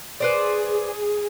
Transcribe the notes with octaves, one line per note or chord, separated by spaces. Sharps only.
G#4 B4 C5 D5